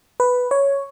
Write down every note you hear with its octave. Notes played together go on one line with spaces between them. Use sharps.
B4
C#5